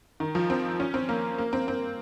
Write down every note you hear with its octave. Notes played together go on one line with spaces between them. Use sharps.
D#3
F3
C4
C#4
C4
A#3
A#3
C4
C4